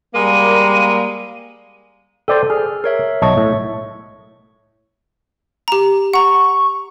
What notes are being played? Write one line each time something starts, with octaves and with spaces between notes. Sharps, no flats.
G3 G#3 A#3 D#7
A4 C5 D5 G5
G#4 F6
A#4 C#5 E5
B1 C#5 D#5 E5 A5 C#6
A2
G4 A#5
F#5 A#5 C#6